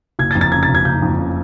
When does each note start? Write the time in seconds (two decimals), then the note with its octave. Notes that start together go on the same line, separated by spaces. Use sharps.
0.19 F#1 G#6
0.31 A6
0.35 F2
0.41 A6
0.52 C#3 G#6
0.63 A6
0.69 F#1
0.75 G#6
0.85 F#1 G6
1.02 F2
1.18 C#3